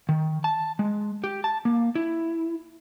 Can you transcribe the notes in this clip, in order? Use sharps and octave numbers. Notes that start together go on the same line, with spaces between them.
D#3
A5
G#3
G4
A5
A#3
E4